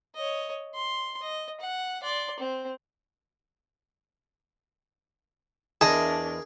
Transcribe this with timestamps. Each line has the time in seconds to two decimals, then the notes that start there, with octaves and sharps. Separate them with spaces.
0.15 C#5 D#5
0.75 C6
1.21 D#5
1.60 F#5
2.03 D5 C6
2.40 C4
5.81 E2 D4 G#4 A#4 D#5 A5